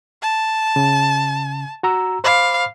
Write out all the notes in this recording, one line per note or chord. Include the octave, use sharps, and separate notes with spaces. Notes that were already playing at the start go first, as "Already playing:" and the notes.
A5
C#3
F#4 A#5 E6
C5 F5 B5 D6